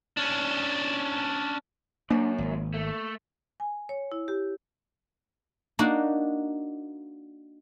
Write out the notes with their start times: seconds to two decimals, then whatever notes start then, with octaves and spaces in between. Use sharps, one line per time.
0.17 C#4 D4
2.11 F#2 A#3 D4
2.38 G#1
2.74 A3
3.60 G#5
3.89 C#5
4.12 E4
4.28 G4
5.79 A#3 D4 D#4 F#4